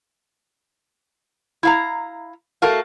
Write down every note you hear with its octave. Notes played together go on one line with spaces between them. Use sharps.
E4 F5 A#5
A3 F#4 A4 A#4 F5